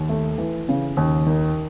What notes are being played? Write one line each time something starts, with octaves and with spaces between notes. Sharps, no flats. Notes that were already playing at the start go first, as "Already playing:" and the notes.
Already playing: D#2
A3
E3
C#3
D#2
D#3